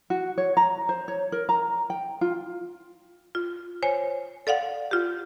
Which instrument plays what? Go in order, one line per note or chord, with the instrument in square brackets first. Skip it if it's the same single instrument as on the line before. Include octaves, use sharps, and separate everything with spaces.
[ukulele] F#4
C#5
A#5
C5
C#5
A#4
A#5
G5
F4
[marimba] F4
C5 C#5 G#5
A4 D5 F5 F#5
F4 G4